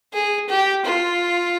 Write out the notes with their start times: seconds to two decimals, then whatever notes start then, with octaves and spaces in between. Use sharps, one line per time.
0.13 G#4
0.49 G4
0.85 F4